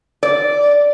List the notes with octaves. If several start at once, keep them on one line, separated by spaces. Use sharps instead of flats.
D5